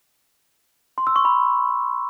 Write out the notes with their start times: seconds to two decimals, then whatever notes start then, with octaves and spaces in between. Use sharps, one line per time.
0.98 C6
1.07 E6
1.16 C#6
1.25 B5